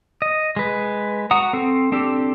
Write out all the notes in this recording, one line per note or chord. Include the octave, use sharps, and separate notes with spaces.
D#5
G#3 B4
F#4 F#5 A#5 D#6
C4 A4
C4 D4 G4 A4